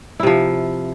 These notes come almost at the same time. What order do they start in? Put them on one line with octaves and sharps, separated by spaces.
E4 C3 F3